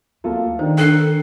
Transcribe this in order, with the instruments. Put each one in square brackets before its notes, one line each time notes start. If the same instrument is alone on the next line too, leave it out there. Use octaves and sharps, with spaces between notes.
[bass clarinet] D2 [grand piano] A#3 F4 A4
[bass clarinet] D#3 [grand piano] D4 D#4 [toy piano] C5
[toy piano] D4 G5 [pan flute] A4 [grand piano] F#6 C7